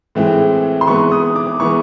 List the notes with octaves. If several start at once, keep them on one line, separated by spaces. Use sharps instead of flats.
A2 E3 G#3 C4
C6
E3 G#3 B3 C#6
D#6
D6
E3 G#3 B3 C#6